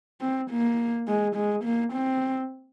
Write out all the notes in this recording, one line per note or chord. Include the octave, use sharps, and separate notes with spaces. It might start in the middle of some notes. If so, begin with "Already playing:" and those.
C4
A#3
G#3
G#3
A#3
C4